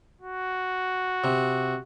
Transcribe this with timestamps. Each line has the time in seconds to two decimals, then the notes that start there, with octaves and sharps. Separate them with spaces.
0.21 F#4
1.24 C3